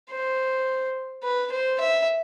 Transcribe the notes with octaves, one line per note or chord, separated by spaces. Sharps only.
C5
B4
C5
E5